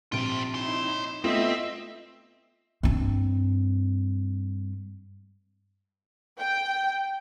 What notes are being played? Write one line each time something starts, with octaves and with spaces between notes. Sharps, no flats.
A#1 E2 C3 F4 D7
D#4 E4 C#5 C6
A3 B3 C4 F4 D#5 E5
G2 C4
G5